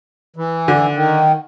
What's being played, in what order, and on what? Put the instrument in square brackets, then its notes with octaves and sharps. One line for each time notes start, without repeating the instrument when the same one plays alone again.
[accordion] E3
[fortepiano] D3
[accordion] D#3